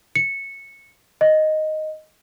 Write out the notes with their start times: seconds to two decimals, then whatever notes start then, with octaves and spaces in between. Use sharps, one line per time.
0.15 C#7
1.21 D#5